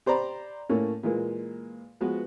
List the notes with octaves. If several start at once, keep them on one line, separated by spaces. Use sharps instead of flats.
G4 C5 D5 A#5 B5
A2 A3 A#3 C#4
A#2 E3 G#3 A#3
F3 G#3 B3 F#4 B4